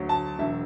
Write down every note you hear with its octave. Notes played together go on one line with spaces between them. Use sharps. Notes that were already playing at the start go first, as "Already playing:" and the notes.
Already playing: D2 F#3
A5
E1 E5